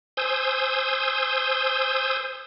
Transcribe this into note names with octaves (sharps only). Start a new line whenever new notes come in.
C5 G#5 D#6 E6 G6